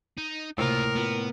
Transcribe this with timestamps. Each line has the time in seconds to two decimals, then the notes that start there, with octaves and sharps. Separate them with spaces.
0.18 D#4
0.58 C#2 A2 C3 A#3 F4 A#4
0.96 B3 F4